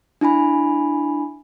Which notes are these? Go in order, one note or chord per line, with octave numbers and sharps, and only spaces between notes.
D4 E4 G#5 B5